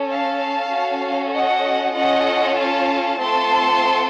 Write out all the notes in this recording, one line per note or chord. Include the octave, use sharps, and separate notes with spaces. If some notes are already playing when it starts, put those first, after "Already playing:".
Already playing: C#4 A4
F5 A5
C#4 F#4 A4
D#5 F#5
C#4 F4 A4 D#5 F#5
F5 A5
A3 C4 F4 A4 A5 C6